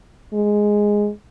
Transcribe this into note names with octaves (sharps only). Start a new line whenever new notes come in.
G#3